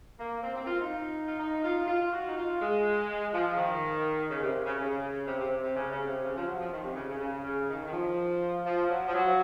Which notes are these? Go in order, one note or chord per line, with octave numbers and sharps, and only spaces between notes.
A#3
C4
C4
F4
D#4
F4
D#4
F4
F4
F#4
D#4
F4
G#3
F3
D#3
C#3
C3
C#3
C#3
C3
C3
C3
C#3
C#3
C3
C#3
F3
F#3
F3
D#3
C3
C#3
C#3
C#3
C#3
D#3
D#3
F3
F3
F#3
F3
F#3